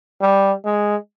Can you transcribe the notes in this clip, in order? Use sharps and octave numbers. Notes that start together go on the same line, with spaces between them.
G3
G#3